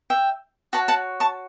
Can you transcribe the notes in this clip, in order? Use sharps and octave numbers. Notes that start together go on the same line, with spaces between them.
E5 G5
F#4 C#5 F#5 A5
F#5 A5
A5 C#6